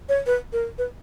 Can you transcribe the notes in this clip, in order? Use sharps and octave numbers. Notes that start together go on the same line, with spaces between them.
C#5
B4
A#4
B4